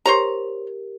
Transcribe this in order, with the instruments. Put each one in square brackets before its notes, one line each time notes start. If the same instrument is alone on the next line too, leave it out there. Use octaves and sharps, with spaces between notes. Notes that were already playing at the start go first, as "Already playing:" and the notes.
[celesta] G4 A#4 [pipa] C5 C#5 A#5